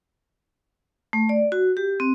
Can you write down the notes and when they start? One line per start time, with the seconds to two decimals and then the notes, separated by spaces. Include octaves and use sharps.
1.13 A3
1.29 D5
1.52 F#4
1.77 G4
2.00 C4